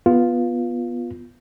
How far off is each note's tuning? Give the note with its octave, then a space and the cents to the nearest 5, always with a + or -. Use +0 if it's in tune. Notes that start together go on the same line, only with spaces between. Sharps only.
B3 -10 F4 +0